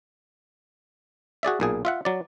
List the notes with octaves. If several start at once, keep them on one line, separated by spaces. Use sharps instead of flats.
F#4 G#4 D5 E5
B1 A#2 G#4
F4 E5 F#5
F#3 D5